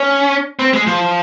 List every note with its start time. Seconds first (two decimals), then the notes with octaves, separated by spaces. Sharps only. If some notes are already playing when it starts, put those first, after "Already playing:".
Already playing: C#4
0.59 C4
0.73 G#3
0.87 F3